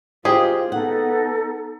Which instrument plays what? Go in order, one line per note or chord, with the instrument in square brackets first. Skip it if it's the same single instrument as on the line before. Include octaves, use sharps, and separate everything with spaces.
[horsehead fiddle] F4 [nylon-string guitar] G4 C5 D#5 [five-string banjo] G#4
[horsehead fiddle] B3 [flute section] D#4 A4 [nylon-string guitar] F#5